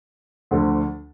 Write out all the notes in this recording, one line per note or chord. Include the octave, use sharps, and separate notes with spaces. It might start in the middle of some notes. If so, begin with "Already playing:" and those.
D2 D3 F3